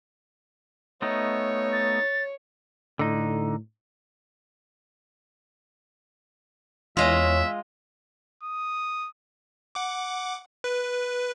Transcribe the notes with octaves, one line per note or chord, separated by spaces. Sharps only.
A3 B3 D#4 C#5
A6
A2 D3 D#4
E2 E3 G#3 F4 C#5 E5
D#6
F#5 D6
B4